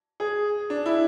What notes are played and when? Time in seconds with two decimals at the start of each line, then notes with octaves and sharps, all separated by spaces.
0.20 G#4
0.70 D4
0.86 E4